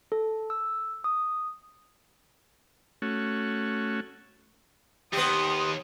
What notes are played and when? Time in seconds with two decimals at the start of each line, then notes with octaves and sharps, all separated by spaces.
0.12 A4
0.50 E6
1.04 D#6
3.02 A3 C#4 F#4
5.13 D#2 B3 G4 C6 D#6